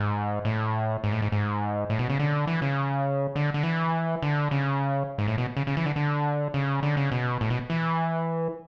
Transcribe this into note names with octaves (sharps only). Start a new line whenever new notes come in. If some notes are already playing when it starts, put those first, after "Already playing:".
Already playing: G#2
A2
G#2
A2
G#2
G#2
A2
B2
C#3
D3
E3
C#3
D3
D3
E3
D3
C#3
G#2
A2
B2
C#3
C#3
E3
D3
D3
C#3
D3
C#3
B2
A2
B2
E3